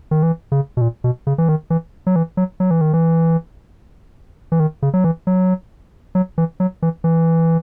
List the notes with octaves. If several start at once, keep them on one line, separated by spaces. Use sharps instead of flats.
D#3
E3
C#3
B2
A#2
B2
C#3
E3
D#3
E3
F#3
E3
F#3
F#3
E3
D#3
E3
E3
D#3
C#3
F#3
E3
F#3
F#3
E3
F#3
E3
E3